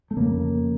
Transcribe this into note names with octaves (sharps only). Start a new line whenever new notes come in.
A3
F2 C#3 A#3